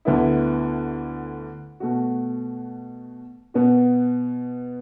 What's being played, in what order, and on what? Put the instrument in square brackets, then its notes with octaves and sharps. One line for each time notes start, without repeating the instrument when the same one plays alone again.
[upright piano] D2 D3 B3 E4
B2 A3 F#4
B2 B3 F#4